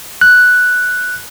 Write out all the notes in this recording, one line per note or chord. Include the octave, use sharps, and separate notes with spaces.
F#6